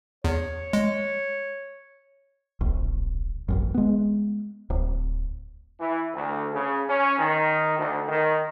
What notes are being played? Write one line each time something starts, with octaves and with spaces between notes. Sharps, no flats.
E2 C#5
G#3
D1 A#1
E1 A1 F#2
G#3 B3
D1
E3
D2
C#3
C#4
D#3
D2
D#3